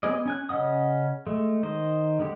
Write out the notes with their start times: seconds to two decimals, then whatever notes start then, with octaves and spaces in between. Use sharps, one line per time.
0.03 B3 C4 G#4 D5 D#5
0.26 C#4 G#5 F#6
0.49 C#3 C#4 D#5 F#5 D#6
1.27 G#3 A3
1.63 D#3 C5 D#5
2.19 D3 G#3 G4